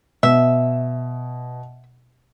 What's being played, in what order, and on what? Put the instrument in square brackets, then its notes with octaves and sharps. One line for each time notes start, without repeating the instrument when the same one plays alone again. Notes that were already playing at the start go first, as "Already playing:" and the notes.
[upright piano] B2 [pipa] E5